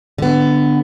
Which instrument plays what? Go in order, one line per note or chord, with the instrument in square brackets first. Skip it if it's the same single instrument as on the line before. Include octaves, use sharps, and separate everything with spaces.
[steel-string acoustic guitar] D3 B3